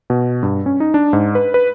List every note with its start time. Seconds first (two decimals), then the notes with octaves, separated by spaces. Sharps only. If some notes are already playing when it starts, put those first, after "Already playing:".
0.10 B2
0.43 G2
0.66 C#4
0.80 D#4
0.94 D4
1.13 G#2
1.35 B4
1.54 B4